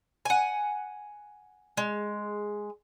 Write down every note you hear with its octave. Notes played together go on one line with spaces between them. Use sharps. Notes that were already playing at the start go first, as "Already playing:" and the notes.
F#5 G#5
G#3